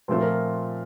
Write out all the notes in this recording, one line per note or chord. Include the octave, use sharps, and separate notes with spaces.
A#2 F3 A3 C4
A#4